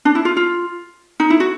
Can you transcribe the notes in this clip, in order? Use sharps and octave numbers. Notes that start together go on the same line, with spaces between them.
D4
E4
F4
F4
D#4
E4
F#4